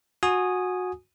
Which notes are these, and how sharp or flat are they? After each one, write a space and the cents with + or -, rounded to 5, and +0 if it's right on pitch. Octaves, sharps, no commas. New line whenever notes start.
F#4 -20 G#5 +0 D#6 -10